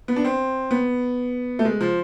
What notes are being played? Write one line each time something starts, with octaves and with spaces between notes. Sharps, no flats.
B3
D4
C4
B3
A3
G#3
F3